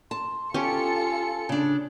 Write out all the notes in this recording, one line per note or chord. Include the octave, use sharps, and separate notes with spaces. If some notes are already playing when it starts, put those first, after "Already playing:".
A5 C6
C#4 F4 G4 A4 G#5 C#7
C#3 D4